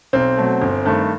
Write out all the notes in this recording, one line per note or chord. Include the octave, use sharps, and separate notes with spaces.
B1 C4
B2 F#3 A3
G1
G2 D#3 A3